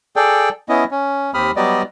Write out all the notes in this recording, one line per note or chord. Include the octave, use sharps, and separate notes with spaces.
G#4 A4 D5 G5
B3 C#4 E4 D#5
C#4
D#2 C4 G4 B5 D#6 F6
F#3 G3 B3 G4 D5 D#5